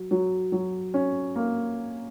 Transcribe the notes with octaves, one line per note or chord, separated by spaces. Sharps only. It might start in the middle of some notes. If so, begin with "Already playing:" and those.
Already playing: F#3
F#3
F#3
C#4
A#3